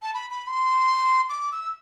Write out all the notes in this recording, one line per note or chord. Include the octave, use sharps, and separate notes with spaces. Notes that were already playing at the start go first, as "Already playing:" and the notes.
A5
B5
B5
C6
D6
E6